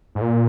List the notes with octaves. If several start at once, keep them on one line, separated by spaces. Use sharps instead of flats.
G#2
A#2